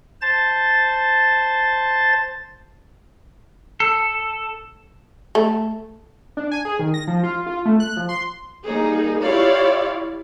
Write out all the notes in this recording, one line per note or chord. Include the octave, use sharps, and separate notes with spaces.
C5 A5 A6
A4
A3
D4
G#5
G#4
D#3
A#6
F3
F4
F4
A3
F#6
F3
C6
G3 A#3 D#4 G#4
E4 F4 G4 C#5 D5 F5